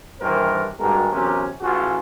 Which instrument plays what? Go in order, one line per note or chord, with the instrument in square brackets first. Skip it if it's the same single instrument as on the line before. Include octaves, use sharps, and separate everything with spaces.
[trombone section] A#1 G2 D#3 E3 A#4 C5
G#1 G2 A#2 G#3 F#4 A#4
A#1 E2 C3 F#3 C#4 A#4
A1 F4 F#4 G#4